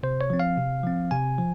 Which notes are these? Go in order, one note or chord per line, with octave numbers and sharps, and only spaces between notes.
C3 C5
C#5
F3 C4
F5
C3
F3 C4
C3 G#5
F3